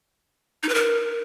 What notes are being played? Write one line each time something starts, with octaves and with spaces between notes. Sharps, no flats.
D#4
B4
A#4